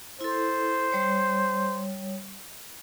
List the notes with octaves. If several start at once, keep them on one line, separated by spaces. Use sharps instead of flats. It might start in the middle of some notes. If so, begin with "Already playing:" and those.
E4 A4 C5
G3 C#5